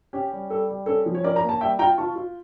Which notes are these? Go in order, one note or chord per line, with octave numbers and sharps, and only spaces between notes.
C#4 G4
G3
G3 A4
G3
C#4 A4
F3
C#5
C#4 A#4 D5
A#5
A#3
A5
G3 E5 G5
F4 G5 A#5
F4 A5 C#6
F4